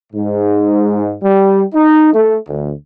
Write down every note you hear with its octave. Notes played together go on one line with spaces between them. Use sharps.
G#2
G3
D#4
A3
D2